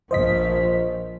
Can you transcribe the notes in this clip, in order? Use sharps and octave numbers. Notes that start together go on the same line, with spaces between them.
A#1 F3 C5 D#5 B6